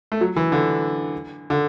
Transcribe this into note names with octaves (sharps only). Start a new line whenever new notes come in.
A3
F#3
E3
D3
D3